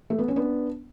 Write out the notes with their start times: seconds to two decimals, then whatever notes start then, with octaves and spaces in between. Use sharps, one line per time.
0.10 A3
0.19 B3
0.28 C#4
0.36 B3 D4